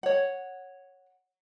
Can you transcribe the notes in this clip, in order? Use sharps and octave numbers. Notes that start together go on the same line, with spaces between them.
C#5 F#5